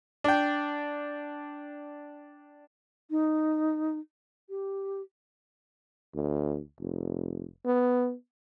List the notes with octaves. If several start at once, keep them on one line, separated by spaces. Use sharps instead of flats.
D4 G5
D#4
G4
D2
F1
B3